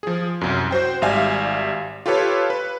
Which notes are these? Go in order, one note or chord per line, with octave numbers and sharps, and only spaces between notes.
F3 G#4
C2 F#2
F#4 C5 G5
G#1 G3 E5 F5 G#5
F4 G4 A4 B4 C#5
B4